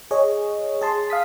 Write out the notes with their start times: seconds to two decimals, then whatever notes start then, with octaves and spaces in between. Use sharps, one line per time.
0.11 G#4 C#5 D#5
0.82 G#4 A5 C6
1.10 F5 D#6 B6